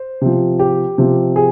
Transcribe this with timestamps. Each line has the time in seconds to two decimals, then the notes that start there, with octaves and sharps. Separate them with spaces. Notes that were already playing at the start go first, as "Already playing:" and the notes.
Already playing: C5
0.22 C3 F3
0.59 G4
0.98 C3 F3
1.36 G#4